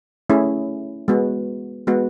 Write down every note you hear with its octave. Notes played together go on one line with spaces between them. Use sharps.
A3 C#4 E4 G#4
G#3 B3 F#4
G#3 B3 F#4